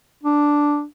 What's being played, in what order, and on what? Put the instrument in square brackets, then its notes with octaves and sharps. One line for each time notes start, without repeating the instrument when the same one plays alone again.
[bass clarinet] D4